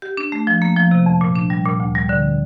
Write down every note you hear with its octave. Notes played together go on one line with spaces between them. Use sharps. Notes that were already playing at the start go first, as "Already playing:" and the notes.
G4
D4
A3
F3
A#3
F3
C3
F2
A#2
D4
G3
A#2
D2
G3
D3